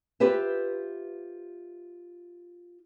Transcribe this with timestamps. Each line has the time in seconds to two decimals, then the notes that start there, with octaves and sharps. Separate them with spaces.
0.20 F4 G4 B4 C5 E5